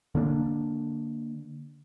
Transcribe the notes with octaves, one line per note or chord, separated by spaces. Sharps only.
D3 A#3 C#4 D4